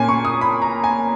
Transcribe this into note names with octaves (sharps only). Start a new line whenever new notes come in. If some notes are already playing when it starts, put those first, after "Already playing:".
Already playing: A#2 A#3 C#4 G#5
C#6
D#6
B5
A#5
G#5